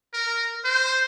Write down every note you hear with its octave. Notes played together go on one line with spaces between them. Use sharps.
A#4
C5